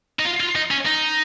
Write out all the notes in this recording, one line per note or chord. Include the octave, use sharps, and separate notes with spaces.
D#4
F4
F4
D#4
C#4
D#4